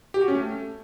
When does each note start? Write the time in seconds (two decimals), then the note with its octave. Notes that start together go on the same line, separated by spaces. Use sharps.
0.14 G4
0.21 F#4
0.28 C#4
0.35 A3